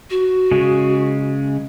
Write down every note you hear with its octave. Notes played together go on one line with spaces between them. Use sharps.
F#4
C#3 G#3